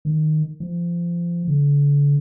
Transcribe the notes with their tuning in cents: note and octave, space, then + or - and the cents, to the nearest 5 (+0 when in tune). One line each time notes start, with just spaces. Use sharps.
D#3 -10
F3 -25
D3 -40